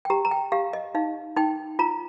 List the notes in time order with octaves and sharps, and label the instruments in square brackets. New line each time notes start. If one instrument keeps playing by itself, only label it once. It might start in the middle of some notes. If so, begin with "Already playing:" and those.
[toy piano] G5
G4 A#5
A#5
G5
G4 F5
D#5
D#4 F5
D#4 G5
F4 A#5